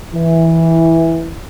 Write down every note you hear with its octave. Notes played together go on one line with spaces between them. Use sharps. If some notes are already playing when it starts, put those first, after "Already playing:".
E3